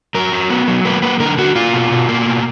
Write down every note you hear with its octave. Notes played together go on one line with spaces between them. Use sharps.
F#3 A#4
F#3
B3
F#3
A#3 B4
A#3 B4
D3 A#4
D3 F#4
A#3 F4
B2
B2
A#3
B2